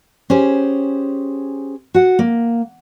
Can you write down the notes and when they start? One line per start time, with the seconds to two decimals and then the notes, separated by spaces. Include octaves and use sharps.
0.30 C#4 G4 G#4 C5
1.94 F#4 F#5
2.19 A#3